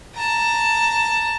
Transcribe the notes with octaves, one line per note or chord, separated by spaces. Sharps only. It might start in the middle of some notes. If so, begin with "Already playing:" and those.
A5 A#5